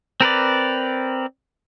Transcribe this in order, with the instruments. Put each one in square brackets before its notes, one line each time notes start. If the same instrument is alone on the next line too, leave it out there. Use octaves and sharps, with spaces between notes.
[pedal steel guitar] C4 A#4 B4 D5